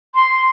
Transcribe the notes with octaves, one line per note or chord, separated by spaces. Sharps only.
C6